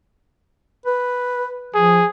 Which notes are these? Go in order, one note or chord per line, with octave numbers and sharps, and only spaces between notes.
B4
F3 G#4